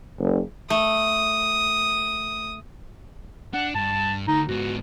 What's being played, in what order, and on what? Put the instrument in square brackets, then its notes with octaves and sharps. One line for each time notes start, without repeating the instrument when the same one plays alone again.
[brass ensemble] F#1
[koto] A3 [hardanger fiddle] D#6
[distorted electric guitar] D4 [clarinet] F#5
[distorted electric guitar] G2 [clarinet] A5
[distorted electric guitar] D2 [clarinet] D#4
[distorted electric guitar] G#2 B3 [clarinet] F#4